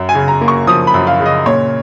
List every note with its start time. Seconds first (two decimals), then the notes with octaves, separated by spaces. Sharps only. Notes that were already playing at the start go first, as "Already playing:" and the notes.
Already playing: F#2
0.09 G#5
0.15 C#3
0.28 A#5
0.41 A#3
0.48 C#6
0.67 F3 D#6
0.87 B5
0.94 F#2
1.07 F5
1.20 C#3
1.26 D#5
1.46 A#2 C#5